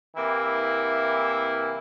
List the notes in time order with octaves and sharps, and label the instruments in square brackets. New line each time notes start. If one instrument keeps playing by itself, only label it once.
[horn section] C3 E3 A#3 E4